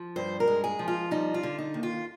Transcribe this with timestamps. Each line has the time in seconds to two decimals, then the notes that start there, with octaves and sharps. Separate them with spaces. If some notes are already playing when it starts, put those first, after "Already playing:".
Already playing: F3
0.16 G2 C5
0.40 A#4
0.47 G#3
0.64 G#4
0.79 F3
0.88 F4
1.11 G3 D#4
1.34 F4
1.43 D3
1.58 D#4
1.74 D#2
1.83 F4